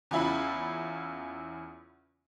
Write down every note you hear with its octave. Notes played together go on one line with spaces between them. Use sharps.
E2 C#3 E4 F4 B5